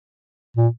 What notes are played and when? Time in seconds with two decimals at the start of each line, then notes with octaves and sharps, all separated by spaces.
0.57 A#2